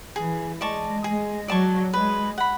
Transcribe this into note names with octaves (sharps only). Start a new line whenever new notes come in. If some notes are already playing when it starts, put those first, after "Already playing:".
E3 G#4
G#3 D5 A5 C#6
G#3 G#4
F#3 D5 A5 C#6
G#3 B4
F#5 B5